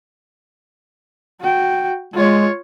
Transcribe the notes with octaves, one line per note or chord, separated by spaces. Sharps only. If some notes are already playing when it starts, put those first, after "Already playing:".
F#4 G5
G#3 F4 C#5